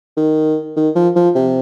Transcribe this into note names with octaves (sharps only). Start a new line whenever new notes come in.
D#3
D#3
F3
F3
C3